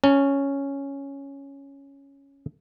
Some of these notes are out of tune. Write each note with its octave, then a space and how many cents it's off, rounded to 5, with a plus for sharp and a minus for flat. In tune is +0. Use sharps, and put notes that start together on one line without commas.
C#4 +0 A5 +40